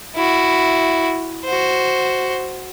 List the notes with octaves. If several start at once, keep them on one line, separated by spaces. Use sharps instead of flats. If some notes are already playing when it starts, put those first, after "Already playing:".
E4 F#4
F#4 C5